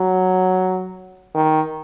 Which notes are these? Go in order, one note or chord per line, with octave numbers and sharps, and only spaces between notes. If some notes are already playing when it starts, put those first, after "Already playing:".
Already playing: F#3
D#3